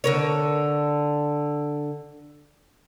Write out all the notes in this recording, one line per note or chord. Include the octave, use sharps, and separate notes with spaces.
D3 A#4 C#5